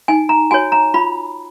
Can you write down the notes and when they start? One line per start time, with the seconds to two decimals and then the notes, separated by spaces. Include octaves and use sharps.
0.08 D#4 G#5
0.29 A#5
0.51 F#4 C#5 G#5
0.72 A#5
0.94 F4 B5